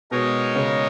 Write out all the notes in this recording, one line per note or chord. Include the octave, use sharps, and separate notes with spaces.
B2 G#3 B3 D#4 A#4 C#5
C#3 C#4